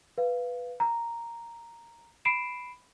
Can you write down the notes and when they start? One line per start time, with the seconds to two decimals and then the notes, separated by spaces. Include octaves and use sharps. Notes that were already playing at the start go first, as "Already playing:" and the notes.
0.18 B4 F5
0.80 A#5
2.25 B5 C7 D7 E7